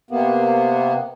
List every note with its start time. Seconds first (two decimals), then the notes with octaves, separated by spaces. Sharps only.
0.11 C3 A#3 B3